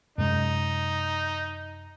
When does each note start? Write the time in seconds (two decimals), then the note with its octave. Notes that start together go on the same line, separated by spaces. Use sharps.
0.18 F#2 C3 G#3 D#4